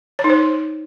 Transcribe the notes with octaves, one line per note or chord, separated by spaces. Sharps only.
C#5
D#4
C5